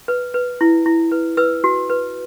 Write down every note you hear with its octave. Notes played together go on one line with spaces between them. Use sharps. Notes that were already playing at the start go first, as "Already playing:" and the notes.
B4
B4
E4
E4
B4
B4 E6
F#4
B4